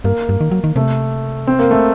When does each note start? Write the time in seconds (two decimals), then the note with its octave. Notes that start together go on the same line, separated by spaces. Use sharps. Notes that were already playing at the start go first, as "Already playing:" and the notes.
0.04 G2 A#3
0.29 G2
0.41 D#3
0.51 F#3
0.64 D#3
0.76 C3 A3
1.47 C4
1.59 A#3
1.71 A3